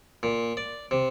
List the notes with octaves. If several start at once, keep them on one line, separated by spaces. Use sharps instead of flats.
A#2
D5
C3